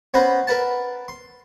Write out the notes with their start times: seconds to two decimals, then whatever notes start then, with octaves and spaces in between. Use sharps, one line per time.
0.14 B3 C#4 B4 C5 A#5 B5
0.47 A#4 B4 F#5 A5
1.08 C6